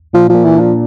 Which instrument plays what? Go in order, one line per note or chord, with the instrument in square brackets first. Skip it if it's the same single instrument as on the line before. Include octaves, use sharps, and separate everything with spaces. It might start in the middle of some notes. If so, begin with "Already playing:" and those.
[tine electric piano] A#2 [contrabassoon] F3
[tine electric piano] A#2 [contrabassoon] F3
[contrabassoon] E3
[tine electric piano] D4
[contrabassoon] F3